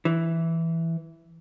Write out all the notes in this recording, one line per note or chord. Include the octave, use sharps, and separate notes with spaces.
E3